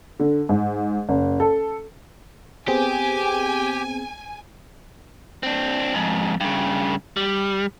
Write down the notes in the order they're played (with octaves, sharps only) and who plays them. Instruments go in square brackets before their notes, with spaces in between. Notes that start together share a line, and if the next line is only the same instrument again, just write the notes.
[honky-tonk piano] D3
G#2
F#1
A4
[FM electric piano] B3 C4 G#4 [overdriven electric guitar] G4 [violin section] G#5
[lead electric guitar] C4 D4
F2 G#2
G2 C#3
G3